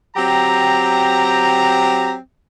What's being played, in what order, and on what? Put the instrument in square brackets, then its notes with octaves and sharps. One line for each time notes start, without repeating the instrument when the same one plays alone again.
[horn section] F#3 C4 G4 A#5